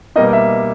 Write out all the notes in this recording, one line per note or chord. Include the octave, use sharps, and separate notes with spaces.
B2 G3 A#3 D#4 D#5
E5